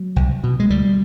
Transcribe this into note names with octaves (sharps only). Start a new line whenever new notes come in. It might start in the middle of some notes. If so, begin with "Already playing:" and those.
Already playing: F#3
C2
B2
G#3
D2 G3